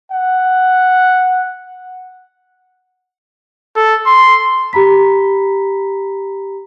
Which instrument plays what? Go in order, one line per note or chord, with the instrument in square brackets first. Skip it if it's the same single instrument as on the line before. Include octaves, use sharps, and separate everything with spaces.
[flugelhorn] F#5
[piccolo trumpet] A4
C6
[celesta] G4 A#5 B5 B6